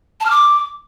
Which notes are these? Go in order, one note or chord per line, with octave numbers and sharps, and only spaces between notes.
A5
F6
D6